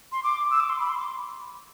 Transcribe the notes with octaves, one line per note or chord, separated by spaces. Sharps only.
C6
D6
E6
D6
C6
B5
C6
D6